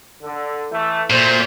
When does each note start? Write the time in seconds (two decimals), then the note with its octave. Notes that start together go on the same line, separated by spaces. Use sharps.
0.22 D3
0.70 E3 A3
1.10 D2 A#2 C5